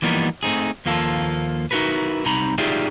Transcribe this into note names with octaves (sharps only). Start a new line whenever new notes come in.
E3 F3 G3 A#3 B3 D#4
A3 C4 D#4 G#4
D#2 F3 A#3 F4 A4
D#4 E4 F#4 A#4 B4
C2 C3 D#4 A#5 B5
D#4 F4 G4 G#4 D5 E5